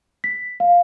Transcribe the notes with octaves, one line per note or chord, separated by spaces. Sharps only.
B6
F5